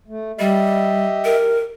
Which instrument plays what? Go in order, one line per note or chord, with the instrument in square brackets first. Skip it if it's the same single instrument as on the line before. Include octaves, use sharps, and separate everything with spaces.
[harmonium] A3
[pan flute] G3 [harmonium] G4 D#5 E5
[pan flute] A#4